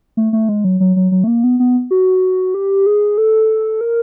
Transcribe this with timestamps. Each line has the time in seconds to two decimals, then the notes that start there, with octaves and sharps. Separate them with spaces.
0.17 A3
0.33 A3
0.49 G#3
0.65 F#3
0.80 F#3
0.96 F#3
1.12 F#3
1.24 A3
1.27 A#3
1.44 B3
1.60 B3
1.91 F#4
2.54 G4
2.86 G#4
3.18 A4
3.81 A#4